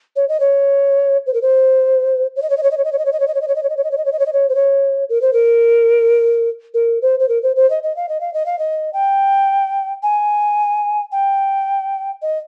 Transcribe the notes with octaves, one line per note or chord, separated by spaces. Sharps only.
C#5
D#5
C#5
C5
A#4
C5
C#5
D#5
C#5
D#5
C#5
D#5
C#5
D#5
C#5
D#5
C#5
D#5
C#5
D#5
C#5
D#5
C#5
D#5
C#5
D#5
C#5
D#5
C#5
D#5
C#5
D#5
C#5
D#5
C#5
C5
C#5
A#4
C5
A#4
A#4
C5
C5
A#4
C5
C5
D#5
D#5
F5
D#5
F5
D#5
F5
D#5
G5
G#5
G5
D#5